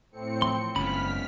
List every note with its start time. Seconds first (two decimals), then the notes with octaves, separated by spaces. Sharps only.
0.12 A2 C4 C#7
0.42 E3 F3 C6
0.76 F#1 G#2 C#3 B5 F6 B6